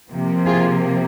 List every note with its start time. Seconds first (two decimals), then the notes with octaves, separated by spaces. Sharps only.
0.11 C3 F3 A#3
0.46 F4 G#4